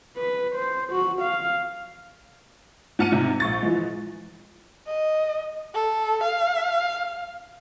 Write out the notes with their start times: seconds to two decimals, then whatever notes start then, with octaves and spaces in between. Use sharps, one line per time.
0.17 B4
0.55 C5
0.92 F#4
1.22 F5
2.99 G#2 F#5 A5 F6 C#7 D#7
3.12 G#2 C3
3.40 A#1 C#6 A6
3.63 E3 F3 G#3
4.87 D#5
5.74 A4
6.23 F5